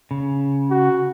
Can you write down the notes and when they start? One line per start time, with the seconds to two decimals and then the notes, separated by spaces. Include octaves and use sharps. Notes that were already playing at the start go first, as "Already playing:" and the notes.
0.11 C#3
0.70 F#4